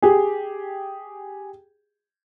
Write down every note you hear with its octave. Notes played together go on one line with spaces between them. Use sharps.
G4 G#4